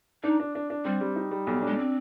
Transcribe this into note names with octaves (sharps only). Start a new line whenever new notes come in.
D4 D#4
D4
D4
D4
G3 C4
G3
D#4
G3
B1 B3
D4
G#3
C4